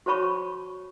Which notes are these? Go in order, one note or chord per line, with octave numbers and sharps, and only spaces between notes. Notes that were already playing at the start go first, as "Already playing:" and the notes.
F#4 C5 C#5 A5 B5 C#6